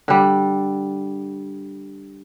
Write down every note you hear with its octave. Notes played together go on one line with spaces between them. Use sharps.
D3 G3